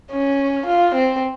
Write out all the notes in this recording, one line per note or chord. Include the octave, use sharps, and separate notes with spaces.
C#4
F4
C4